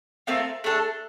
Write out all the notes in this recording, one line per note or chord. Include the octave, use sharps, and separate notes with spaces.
A3 C4 F4 A#4
A3 D4 A4